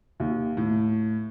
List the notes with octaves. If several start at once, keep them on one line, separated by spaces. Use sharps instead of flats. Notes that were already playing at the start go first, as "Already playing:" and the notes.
D#2
A2